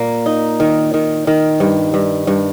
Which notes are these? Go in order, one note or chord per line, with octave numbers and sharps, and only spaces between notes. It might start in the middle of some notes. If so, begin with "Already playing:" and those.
Already playing: A#2 A#3
D#4
D#3
D#3
D#3
G2
G2
G2